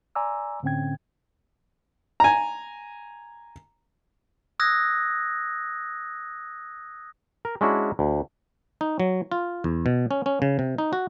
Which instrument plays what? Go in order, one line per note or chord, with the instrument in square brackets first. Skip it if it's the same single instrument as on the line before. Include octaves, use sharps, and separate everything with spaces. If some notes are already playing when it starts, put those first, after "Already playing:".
[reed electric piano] D5 G#5 A#5 C6 D6 E6
A2 D3 C4 C#4 G5 G#6
[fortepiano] G#5 A#5
[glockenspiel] D#6 E6 F#6 G#6 A#6
[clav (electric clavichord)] A#4
G#3 C#4 D4 E4 F#4
D2
D#4
F#3
F4
E2
B2
C#4
C#4
C#3
C3
D#4
F#4